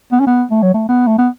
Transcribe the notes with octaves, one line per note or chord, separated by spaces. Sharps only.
B3
C#4
B3
A3
F#3
A3
B3
A3
B3